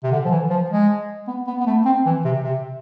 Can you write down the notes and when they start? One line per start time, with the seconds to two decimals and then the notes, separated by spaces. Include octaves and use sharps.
0.04 C3
0.12 D3
0.25 F3
0.31 E3
0.50 F3
0.70 G#3
1.27 B3
1.47 B3
1.60 B3
1.67 A3
1.85 C4
2.06 E3
2.25 C3
2.44 C3